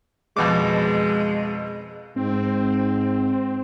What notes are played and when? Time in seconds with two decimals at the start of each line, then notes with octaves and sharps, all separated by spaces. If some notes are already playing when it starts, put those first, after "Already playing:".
0.36 F2 B2 G#3 D6
2.16 G#2 C4